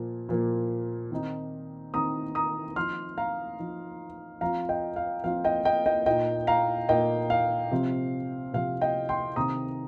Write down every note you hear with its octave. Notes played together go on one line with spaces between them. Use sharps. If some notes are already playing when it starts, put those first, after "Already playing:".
Already playing: A#2 F3 A#3
A#2 F3 A#3
D#3 C4 D#4
D#3 C4 D#4 A#5 D#6
A#5 D#6
F3 D#4 C6 F6
F5 A#5
F3 D#4
F3 C4 F4 F5 A#5
D#5 G5
F5
F3 C4 F4 F5
D#5 G5
D#5 G5
D#5 G5
A#2 A#3 D#4 D#5 G5
F5 A#5
A#2 A#3 D#4 D#5 G5
F5
C3 F3 C4
C3 F3 C4 F5
D#5 G5
G5 C6
C3 D#3 C4 A#5 D#6